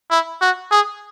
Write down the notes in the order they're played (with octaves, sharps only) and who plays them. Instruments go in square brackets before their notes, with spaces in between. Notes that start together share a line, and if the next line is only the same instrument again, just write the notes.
[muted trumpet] E4
F#4
G#4